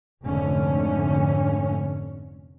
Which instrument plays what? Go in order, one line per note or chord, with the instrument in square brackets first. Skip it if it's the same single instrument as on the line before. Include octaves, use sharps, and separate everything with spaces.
[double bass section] F1 G#2 D3 A3 C#4